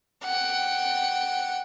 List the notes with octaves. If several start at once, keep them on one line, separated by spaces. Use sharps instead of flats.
F#5 G5